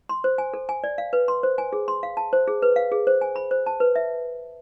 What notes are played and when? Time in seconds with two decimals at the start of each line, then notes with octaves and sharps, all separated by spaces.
0.09 C6
0.24 C5
0.38 G#5
0.54 A4
0.69 G#5
0.84 D5
0.98 F5
1.13 B4
1.28 C6
1.43 C5
1.58 G#5
1.73 G#4
1.88 C6
2.03 F5
2.17 A5
2.33 C5
2.48 G#4
2.62 B4
2.76 F5
2.92 G#4
3.07 C5
3.21 G#5
3.36 B5
3.51 C5
3.66 A5
3.80 B4
3.96 E5